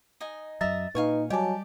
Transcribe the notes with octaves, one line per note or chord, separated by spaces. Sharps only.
D#4 D#5 G#5
F#2 F#3 D#5 E5 A#5 A6
A#2 D#4 B4 F5 G#5 C#6
F#3 G3 G4 D5 D#5 G#5 A5